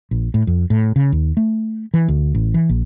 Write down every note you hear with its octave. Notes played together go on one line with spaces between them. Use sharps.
A#1
A2
F2
A2
C#3
D#2
A3
E3
D2
A1
E3
A#1